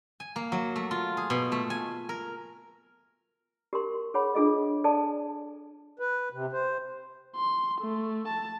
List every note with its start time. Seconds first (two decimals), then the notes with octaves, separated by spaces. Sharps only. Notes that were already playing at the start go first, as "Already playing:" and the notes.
0.20 G#5
0.36 A#3
0.52 F#3
0.76 A3
0.91 F4
1.17 G#4
1.30 B2
1.52 A3
1.70 G#5
2.09 A#4
3.73 G4 A#4 C6
4.14 G#4 C#5 F#5 B5
4.35 D4 F4 G#4 A4 D#5
4.84 A4 D5 G#5 A5
5.99 B4
6.33 C3
6.53 C5
7.36 C6
7.81 A3
8.28 A5